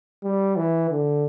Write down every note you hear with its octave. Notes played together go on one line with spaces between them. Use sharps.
G3
E3
D3